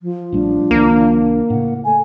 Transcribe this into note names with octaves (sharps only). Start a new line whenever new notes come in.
F3
A1 G3 A3 D4
C2 D#3 A#3
A2 C#3 F#5
A3 G#5